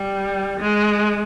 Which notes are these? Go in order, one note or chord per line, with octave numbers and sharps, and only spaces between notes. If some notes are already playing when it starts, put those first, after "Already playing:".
Already playing: G3
G#3